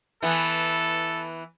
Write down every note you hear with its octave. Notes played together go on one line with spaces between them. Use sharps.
E3 B3 A4